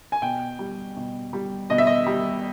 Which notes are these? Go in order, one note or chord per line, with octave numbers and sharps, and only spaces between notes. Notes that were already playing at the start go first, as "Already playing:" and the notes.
G#5
B2 G5
G3
B2
G3
B2 D#5
E5
D#5
G3